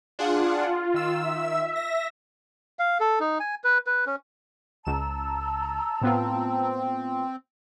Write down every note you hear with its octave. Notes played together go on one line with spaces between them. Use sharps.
D4 F4 G#4 F#5
D#3 E6
E5
A#6
F5
A4
D#4
G#5
B4
B4
C#4
C#2 A5 A#5 E6 E7
A2 B3 C4 F4